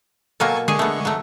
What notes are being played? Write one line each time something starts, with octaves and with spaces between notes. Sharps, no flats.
B2 F#3 A#3 A4 G#5 C#6
D3 G#3 G#4 C#6
A3 B3
F#3 A3